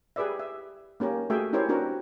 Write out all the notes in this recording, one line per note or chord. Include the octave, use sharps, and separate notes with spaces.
G4 G#4 B4 D5 E5
E5
A#3 C#4 G4 A#4
A3 F#4 G#4 E5 G5
C#4 E4 G4 A#4 C5 C#5
C4 D4 F#4 A#4 B4